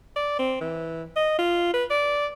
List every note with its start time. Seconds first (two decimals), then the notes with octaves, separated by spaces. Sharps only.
0.16 D5
0.39 C4
0.61 E3
1.16 D#5
1.39 F4
1.74 B4
1.90 D5